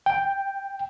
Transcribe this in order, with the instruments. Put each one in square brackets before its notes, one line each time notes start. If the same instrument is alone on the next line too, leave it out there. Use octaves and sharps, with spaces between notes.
[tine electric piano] G5